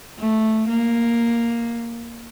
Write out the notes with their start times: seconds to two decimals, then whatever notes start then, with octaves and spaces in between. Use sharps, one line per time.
0.19 A3
0.68 A#3